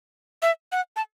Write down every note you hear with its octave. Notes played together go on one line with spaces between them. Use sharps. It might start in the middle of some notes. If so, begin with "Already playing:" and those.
E5
F#5
A5